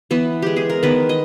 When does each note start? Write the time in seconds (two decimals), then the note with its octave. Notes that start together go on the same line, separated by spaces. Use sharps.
0.11 E3 B3 B4
0.42 G#3 G4
0.56 G#4
0.70 A#4
0.83 D#3 B3 B4
1.09 D#5